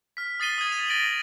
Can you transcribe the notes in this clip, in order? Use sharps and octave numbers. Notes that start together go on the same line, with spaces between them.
F6 B6
D#6 A6 C7 D#7 G7
D#6 G#6
D#7 F7
A6 A#6 D7 F7 F#7